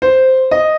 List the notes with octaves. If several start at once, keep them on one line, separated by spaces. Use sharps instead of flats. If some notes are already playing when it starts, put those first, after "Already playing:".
C5
D#5